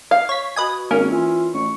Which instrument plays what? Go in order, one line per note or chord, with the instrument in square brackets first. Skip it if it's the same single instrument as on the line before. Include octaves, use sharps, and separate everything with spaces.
[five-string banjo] F5
[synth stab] C#5 B6
[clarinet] F#4 [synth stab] B4 D#5 G#5
[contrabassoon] G#1 [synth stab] A#3 [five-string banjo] C#4
[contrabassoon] E3 [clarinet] F4
[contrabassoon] A1 [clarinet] C#6